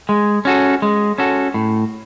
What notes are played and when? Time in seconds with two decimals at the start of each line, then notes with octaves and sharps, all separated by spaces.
0.09 G#3
0.45 C#4 F#4 A4
0.82 G#3
1.18 C#4 F#4 A4
1.54 A2